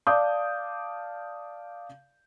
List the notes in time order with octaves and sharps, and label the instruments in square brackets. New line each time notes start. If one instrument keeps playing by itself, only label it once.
[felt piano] D5 F5 A5 D6 D#6 G6